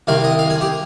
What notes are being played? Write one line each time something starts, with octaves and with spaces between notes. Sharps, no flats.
C2 C3 D#3 F5
D#5
F5
G#4
G4